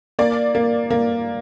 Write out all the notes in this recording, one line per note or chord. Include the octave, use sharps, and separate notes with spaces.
A#3 D5
A#3
A#3